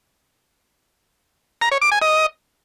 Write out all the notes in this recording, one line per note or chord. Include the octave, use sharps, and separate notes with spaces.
A#5
C#5
D6
G#5
D#5